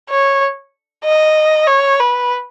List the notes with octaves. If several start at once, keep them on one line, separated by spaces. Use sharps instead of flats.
C#5
D#5
C#5
B4